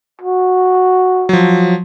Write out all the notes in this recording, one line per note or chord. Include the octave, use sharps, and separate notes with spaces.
F#4
F3 F#3